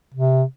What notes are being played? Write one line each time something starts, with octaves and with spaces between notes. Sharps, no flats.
C3